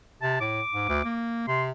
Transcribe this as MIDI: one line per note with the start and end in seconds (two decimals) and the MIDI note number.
0.22 0.36 48
0.22 0.37 81
0.40 0.61 45
0.40 1.10 86
0.73 0.89 44
0.89 1.04 38
1.04 1.47 58
1.47 1.71 48
1.47 1.63 84